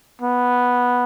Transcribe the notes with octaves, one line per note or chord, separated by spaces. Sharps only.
B3